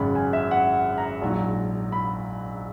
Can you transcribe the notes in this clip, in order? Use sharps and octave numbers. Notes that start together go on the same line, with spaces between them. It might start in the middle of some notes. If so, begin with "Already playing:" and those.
Already playing: G#1 F#2 C#3 B5
G#5
E5
F#5
A#5
A#1 G#2 F#3
B5